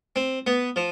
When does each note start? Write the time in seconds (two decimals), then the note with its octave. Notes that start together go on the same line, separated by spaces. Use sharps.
0.16 C4
0.47 B3
0.76 F3